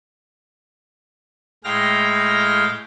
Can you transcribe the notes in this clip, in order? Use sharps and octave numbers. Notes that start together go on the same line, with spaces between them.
A2 G#3 F5 G5 F6 A#6